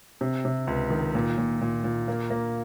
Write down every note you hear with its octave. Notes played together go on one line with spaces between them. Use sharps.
C3
C3
C#2
D#3
A#2
A#2
A#2
A#2
A#3
A#3